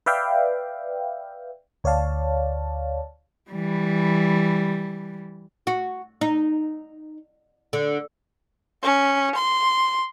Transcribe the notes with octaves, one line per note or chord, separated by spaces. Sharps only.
B4 D5 E5 F5 G5
D2 C#5 D5 F5 A5
E3 G3
F#4
D#4
D3
C#4
C6